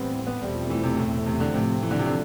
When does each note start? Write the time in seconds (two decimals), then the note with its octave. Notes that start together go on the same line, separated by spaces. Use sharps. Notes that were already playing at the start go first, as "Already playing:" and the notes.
Already playing: A2 E3 G3 B3 C4
0.27 B3
0.41 E2 B2 G3 A3 C4
0.55 F3
0.70 E3
0.83 C3
0.97 A2
1.26 C3
1.40 D3
1.54 A2 C3 F3 A3 C4
1.82 E3
1.91 D3
1.99 C3
2.06 D3